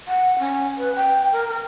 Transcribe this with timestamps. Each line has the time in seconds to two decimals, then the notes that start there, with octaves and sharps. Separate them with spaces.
0.08 F#5
0.39 C#4
0.78 B4
0.96 G5
1.32 A#4
1.48 A#4